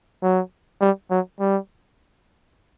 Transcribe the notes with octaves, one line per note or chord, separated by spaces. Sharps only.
F#3
G3
F#3
G3